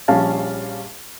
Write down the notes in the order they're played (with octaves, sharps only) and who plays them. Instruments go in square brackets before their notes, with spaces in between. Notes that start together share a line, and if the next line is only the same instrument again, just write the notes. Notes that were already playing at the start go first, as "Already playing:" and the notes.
[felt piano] A#1 G3 C#4 F5 A5